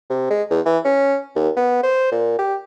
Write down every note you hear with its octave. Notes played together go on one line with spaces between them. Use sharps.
C3
G#3
E2
E3
C#4
D#2
B3
C5
A#2
G4